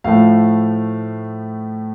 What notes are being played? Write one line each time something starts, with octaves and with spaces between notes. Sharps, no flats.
A2 F3 A3 F5